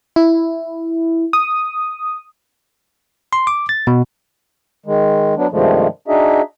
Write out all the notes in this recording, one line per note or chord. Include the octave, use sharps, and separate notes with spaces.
E4
D#6
C6
D6
A6
B2
D#3 G#3
F#3 B3 D4
G2 C3 D#3 F3 G#3 A3
D4 D#4 F#4 G#4 D#5 E5